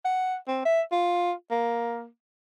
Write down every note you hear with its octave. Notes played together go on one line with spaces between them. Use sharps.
F#5
C4
E5
F4
A#3